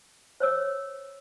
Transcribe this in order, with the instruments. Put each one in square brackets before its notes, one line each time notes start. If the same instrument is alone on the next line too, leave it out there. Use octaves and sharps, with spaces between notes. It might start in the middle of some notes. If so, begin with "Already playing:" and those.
[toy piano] C5 C#5 E6